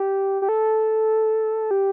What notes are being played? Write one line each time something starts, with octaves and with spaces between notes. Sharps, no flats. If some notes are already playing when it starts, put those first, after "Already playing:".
Already playing: G4
G4
A4
G4